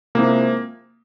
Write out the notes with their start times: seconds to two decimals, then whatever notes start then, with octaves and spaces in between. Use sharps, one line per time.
0.15 C3 F3 G#3 A#3 C4 E4